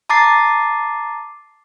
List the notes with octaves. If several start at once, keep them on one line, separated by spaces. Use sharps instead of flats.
A5 A#5 D6 A6 C7